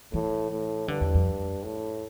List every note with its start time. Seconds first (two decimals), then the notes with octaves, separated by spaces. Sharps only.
0.13 A2 E3
0.51 A2
0.88 G2 D3
1.01 E2
1.14 F2
1.64 A2